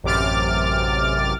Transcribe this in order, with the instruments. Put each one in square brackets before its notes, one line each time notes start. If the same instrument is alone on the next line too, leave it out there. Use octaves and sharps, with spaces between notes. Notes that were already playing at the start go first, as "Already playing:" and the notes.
[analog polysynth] A1 F#2 C3 D6 F6 A6